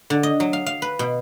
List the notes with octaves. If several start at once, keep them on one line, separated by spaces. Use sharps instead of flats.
D3
D#5
F#3
F5
F5
B4
B2